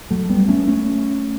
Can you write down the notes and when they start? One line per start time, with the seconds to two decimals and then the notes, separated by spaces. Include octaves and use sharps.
0.11 F#3 A3
0.29 G3 B3
0.48 A3 C#4
0.67 A3 C#4